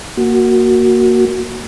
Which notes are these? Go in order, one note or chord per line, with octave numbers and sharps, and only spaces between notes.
A#3 F#4